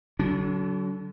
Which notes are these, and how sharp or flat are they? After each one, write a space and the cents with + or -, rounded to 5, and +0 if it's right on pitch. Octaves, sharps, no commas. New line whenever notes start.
D3 -10 F#3 +30 D4 -40